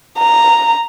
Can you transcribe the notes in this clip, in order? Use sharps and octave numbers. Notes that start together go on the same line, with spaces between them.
A#5